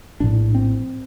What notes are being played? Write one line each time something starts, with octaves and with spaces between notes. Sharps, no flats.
A#1 A2 D4
C4